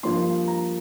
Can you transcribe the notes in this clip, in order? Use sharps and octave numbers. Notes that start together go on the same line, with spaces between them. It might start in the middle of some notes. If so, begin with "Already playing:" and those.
G2 F3 A#3 C6
A#5